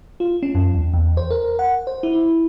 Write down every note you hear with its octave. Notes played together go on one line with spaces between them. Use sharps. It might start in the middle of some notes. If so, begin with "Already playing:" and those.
F4
C#4
F#2
E2
E2
C5
A#4
F#5
C5
E4